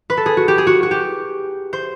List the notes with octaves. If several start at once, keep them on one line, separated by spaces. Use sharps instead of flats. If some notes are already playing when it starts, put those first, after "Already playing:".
B4
A4
G#4
F#4
G4
G#4
F#4
F#4
G4
C5